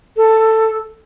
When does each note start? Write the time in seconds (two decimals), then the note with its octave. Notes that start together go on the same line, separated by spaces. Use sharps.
0.17 A4